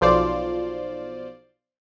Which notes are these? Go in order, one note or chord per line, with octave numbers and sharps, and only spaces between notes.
B1 F3 F4 C5 D5